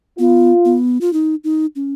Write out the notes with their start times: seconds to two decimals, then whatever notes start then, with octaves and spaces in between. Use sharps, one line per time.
0.18 B3 F4
0.65 B3
1.01 F4
1.13 D#4
1.44 D#4
1.76 C#4